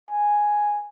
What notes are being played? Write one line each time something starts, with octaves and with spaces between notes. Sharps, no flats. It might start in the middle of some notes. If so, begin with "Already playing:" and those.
G#5